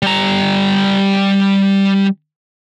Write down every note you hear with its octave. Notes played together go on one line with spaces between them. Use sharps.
G3 A#5